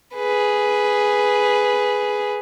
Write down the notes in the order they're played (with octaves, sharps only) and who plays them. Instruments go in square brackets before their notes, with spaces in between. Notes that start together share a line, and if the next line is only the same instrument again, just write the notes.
[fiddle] G#4 B4